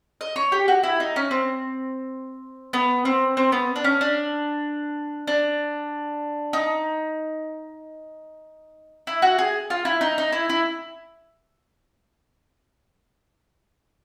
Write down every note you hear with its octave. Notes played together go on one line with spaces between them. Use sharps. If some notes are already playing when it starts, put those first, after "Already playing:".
D#5
C#5
G4
F#4
E4
D#4
C#4
C4
B3
C4
C4
B3
D4
C#4
D4
D4
D#4
E4
F#4
G#4
F4
E4
D#4
D#4
E4
E4